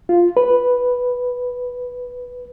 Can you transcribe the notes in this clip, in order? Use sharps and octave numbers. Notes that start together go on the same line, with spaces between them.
F4
B4